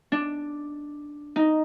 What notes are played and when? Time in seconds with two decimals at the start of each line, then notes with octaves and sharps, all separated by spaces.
0.12 D4
1.36 D#4